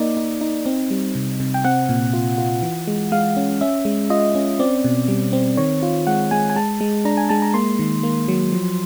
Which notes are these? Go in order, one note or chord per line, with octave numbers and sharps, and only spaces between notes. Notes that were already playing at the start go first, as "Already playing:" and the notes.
Already playing: A#3 D#4 D5
D#4
D#4
C4
G3
C3
C3
G5
C4 F#5
A#2
F4
F4
E3
G#3
G#3 F5
C#4
C#4 E5
G#3
F4 D#5
C#4
C4 D5
B2
G3
C4
D#3 C#5
F4
G#3 F#5
G#3 G#5
G#5
G#3 A5
G#3
D4 A#5
G#5
G#3 A5
A#5
A#3 C6
D#3
A#3
F#3
F3